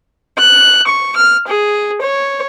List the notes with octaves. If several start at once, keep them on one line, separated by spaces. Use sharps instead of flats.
F#6
C#6
F6
G#4
C#5